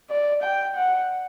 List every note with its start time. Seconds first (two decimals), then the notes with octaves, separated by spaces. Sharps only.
0.10 D5
0.43 G5
0.75 F#5